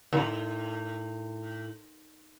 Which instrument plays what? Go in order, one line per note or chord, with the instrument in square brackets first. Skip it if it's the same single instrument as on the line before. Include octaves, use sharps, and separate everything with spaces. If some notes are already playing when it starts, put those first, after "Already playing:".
[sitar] D#2 A2